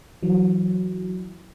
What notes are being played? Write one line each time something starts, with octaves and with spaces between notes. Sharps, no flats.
E3 F#3